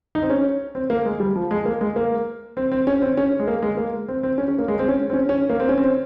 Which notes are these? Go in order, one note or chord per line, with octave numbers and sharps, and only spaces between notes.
D#4
C4
C#4
C4
A#3
G#3
G3
F3
G#3
A#3
G#3
A#3
C4
C4
C#4
C4
C#4
G#3
A#3
G#3
A#3
C4
C4
C#4
C#4
A#3
G#3
C4
C#4
C4
C#4
C#4
A#3
C4
C#4
C4